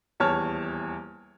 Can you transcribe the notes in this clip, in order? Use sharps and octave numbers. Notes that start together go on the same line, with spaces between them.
D#1 E2 C#5 A5 F6